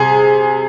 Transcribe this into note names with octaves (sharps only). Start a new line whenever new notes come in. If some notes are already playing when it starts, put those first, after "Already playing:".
Already playing: C3 G#4